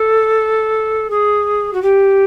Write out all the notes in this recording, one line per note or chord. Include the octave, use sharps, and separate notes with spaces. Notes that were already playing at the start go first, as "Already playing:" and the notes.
Already playing: A4
G#4
F#4
G4